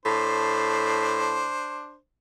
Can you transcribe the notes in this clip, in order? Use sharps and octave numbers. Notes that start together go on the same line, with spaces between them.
A2 D4 C5